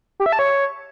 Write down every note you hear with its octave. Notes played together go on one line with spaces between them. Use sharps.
G4
E5
A5
C#5